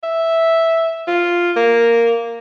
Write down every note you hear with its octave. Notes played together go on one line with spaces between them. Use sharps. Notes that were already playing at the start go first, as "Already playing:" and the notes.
E5
F4
A#3